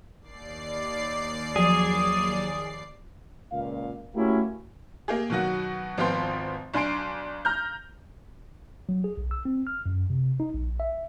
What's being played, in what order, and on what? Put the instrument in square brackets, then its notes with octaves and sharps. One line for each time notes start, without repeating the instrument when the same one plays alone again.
[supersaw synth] D#2 D5 C7
[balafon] F3 [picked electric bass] F#3 [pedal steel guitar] G#4
[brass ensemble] C#2 A#2 F5
A3 A#3 C#4 E4 F#4 G4
[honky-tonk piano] A#3 G4 G#4
B2 D#3 F#3 F#4
G#1 F3 B3 F4 G5 C6
B1 D4 G#5 C6 C7 D7
A#5 F6 G6
[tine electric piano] F#3
G#4
B1
E6
C4
F6
F#2
C3
D#4
A#1
E5